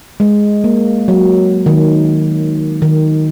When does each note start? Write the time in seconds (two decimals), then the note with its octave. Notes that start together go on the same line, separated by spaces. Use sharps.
0.20 G#3
0.64 A#3
1.08 F#3
1.66 D#3
2.82 D#3